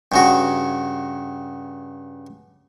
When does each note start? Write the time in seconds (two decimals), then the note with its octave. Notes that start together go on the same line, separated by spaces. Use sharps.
0.12 G2 C#3 F#4